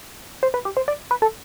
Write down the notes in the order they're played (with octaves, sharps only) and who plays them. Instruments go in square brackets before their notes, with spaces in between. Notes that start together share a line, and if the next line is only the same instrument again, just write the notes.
[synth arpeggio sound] C5
B4
G4
C5
D5
B4
A4